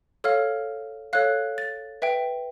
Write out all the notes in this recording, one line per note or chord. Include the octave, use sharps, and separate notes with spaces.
A4 C#5 F5 F6
A4 C#5 F5 F#6
A6
B4 E5 G5